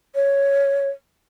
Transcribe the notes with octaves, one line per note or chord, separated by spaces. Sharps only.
C#5